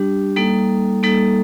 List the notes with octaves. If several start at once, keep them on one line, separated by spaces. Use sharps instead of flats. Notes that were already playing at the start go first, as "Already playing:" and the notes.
Already playing: G3 D4 G4
G3 A#3 D#4 A4
G3 A#3 D#4 A4